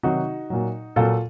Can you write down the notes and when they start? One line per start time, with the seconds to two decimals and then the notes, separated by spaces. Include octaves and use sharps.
0.03 C3 D#3 F#3 D#4 F#4
0.50 A#2 F#3
0.96 A#2 F#3 F4 A4